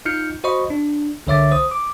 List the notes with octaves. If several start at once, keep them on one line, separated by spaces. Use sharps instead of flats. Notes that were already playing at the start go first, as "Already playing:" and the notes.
D#4 F4 F6 G6 C#7
F#4 C5 D#5 B5 C#6
D4
C2 D3 C#5 E5 D6 A6
C5 D#6
D6